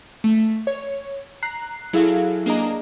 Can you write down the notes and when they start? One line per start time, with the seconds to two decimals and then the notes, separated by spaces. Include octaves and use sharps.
0.24 A3
0.67 C#5
1.43 A#5 F#6 C7
1.93 F#3 E4 G#4 A4 F5
2.46 A#3 D4 G#4 D#5 A#5